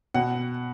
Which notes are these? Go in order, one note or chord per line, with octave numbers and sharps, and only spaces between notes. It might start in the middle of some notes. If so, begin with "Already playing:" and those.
B2 F#5